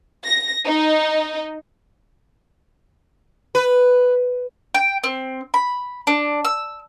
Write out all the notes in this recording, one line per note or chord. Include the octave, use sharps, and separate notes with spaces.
A#6
D#4
B4
G5
C4
B5
D4
E6